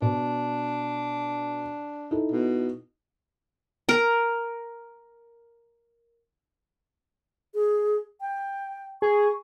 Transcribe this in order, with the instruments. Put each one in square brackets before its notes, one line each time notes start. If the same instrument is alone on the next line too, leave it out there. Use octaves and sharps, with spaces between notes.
[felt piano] B2 [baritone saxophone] D4
[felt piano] D#4 E4 A4
[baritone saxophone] B2
[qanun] A#4 A#5
[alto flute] G#4
G5
[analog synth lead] G#4 [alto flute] C#6